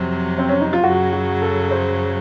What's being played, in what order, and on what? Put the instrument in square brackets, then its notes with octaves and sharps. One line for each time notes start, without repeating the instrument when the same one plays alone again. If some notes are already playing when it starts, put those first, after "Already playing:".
Already playing: [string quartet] F2 C3 F#3
[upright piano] C4
C#4
D#4
F4
[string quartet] F#2 C#3 F#3 [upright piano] F#4
[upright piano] F#4
A4
C5